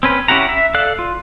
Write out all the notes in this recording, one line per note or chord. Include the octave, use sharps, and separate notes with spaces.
C4 C#4 B4
C#4 E4 G4 F#5 A#5
E5
A4 D5 F5 F#6
F4